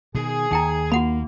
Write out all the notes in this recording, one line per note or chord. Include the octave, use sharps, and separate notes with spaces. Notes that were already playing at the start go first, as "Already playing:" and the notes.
B2 D#3 G#4
D#2 D#3 D#4 G5 A#5
A#3 F#4 F#5 B5